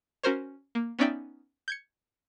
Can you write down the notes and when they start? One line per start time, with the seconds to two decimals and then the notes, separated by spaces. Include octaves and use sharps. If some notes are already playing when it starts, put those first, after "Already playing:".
0.23 C#4 F#4 A#4 C5 C#5
0.75 A#3
0.99 B3 C#4 D#4 D5 E5 G5
1.68 G6 G#6 C#7